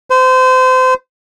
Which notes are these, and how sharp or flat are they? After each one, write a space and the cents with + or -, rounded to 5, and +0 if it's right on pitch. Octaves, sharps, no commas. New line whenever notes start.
C5 -30